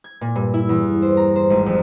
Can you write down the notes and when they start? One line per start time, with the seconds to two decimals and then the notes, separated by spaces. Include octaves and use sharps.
0.04 G#6
0.21 A#2
0.36 G2
0.54 E4
0.69 E2
1.02 C5
1.17 A#5
1.36 C5
1.50 G#1
1.66 F2